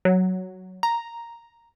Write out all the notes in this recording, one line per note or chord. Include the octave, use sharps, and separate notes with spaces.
F#3
A#5